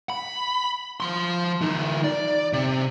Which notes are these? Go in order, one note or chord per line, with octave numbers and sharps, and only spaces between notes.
B5
F3 C6
E3 D#4
D5
C3